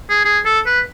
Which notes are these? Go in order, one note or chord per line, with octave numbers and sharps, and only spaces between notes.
G#4
G#4
A4
B4